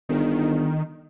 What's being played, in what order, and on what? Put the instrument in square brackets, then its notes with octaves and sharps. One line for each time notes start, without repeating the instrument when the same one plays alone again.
[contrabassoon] G1 [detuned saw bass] D#3